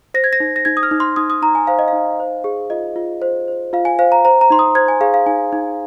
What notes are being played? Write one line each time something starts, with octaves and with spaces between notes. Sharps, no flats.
C5 A#6
G#6
A#6
D#4
A#6
D#4 G#6
D#6
F6
D#4
C6
D#4 D#6
D#6
D#4 A#5
G#5
C5 F5
D#5
F5
D#4
C5
G#4
F4 D#5
F4
C5
C5
F4 F5
G#5
C5 F5
A#5
C5 A#5
A#5
D#4 C6
D#6
C5 G#6
G#5
G#4 F5
F5
D#4 G#5
D#4